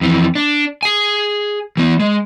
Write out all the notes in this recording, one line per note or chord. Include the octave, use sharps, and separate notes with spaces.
F2 E3
D4
G#4 G#5
E3 B3
G#3